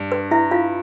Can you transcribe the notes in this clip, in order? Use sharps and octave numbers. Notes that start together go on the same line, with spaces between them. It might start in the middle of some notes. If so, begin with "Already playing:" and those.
Already playing: G2
B4
E4 E5
F4 F5